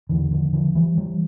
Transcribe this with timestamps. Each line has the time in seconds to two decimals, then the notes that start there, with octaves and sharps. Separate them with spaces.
0.09 E2 D3 E3
0.31 D3 F3
0.53 D3 F3
0.75 E3 G3
0.98 E3 G3